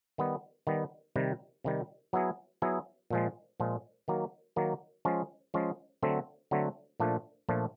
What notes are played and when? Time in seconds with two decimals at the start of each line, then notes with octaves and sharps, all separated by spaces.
0.18 D#3 G3 B3
0.67 D#3 G3 B3
1.16 C3 D#3 G3
1.64 C3 D#3 G3
2.13 F#3 B3 E4 G#4
2.62 F#3 B3 E4 G#4
3.10 A#2 F3 G#3
3.60 A#2 F3 G#3
4.08 D#3 F#3 A#3
4.56 D#3 F#3 A#3
5.05 F3 G#3 C#4
5.54 F3 G#3 C#4
6.02 D3 F#3 A3 C4
6.51 D3 F#3 A3 C4
7.00 A#2 F3 A3 D4
7.49 A#2 F3 A3 D4